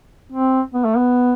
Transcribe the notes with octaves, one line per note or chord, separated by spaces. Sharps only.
C4
B3
A3
B3